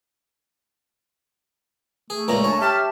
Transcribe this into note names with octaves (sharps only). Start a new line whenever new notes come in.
A3 G#4
C#2 A#2 C#4 A#5
D4 C#5 G#5 A5
G4 E5 A5 F6